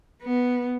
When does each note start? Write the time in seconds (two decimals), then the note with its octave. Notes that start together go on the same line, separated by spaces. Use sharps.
0.24 B3